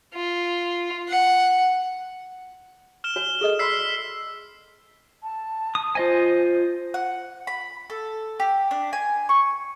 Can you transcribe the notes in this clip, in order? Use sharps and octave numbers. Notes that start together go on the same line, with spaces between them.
F4
F#5
F6 E7 G7
F#4 C#5 G#5
G#4 A4 D#5
D5 B5 C6 E6 B6 C7
A5
D#6
F4 C5 D#5 G#5
F#5
B5
A4
G4
D4
G#5
C#6